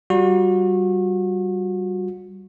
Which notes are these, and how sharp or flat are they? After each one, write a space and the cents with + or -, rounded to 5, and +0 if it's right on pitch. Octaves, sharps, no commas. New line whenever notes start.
G3 -25 F#4 -35